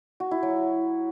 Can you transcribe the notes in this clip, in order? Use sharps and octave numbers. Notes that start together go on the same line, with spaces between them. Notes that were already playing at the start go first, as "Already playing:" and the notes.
F#4
E4
F#3